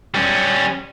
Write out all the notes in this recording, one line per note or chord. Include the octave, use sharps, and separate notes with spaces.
G3 C#4